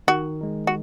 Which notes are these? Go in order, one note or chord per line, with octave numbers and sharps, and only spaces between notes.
D#3 F#4
G#3 D#4
F#4